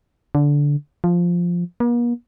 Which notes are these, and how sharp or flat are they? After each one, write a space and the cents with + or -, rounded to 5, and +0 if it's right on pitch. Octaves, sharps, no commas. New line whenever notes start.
D3 -15
F3 +0
A#3 +45